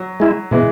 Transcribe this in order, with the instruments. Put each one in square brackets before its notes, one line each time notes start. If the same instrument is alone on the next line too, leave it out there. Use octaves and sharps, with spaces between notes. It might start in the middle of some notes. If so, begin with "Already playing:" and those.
Already playing: [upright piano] F#3
[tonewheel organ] G#3 E4
[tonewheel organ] B2 [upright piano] E3 G#3